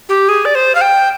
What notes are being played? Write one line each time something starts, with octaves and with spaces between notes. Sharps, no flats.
G4
G#4
D5
C5
F5
G5